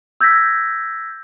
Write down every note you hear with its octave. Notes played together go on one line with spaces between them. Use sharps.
E6 G6 G#6 A#6 B6